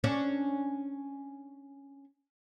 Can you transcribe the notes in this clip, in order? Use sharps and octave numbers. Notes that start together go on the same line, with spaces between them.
C#4 D4